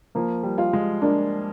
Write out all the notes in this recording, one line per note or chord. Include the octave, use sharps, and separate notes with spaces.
F3 A#3
G3
F4
G#3
A#3 D4